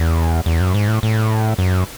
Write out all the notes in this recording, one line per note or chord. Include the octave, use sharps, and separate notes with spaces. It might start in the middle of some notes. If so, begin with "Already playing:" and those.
Already playing: E2
E2
F#2
G#2
A2
A2
F#2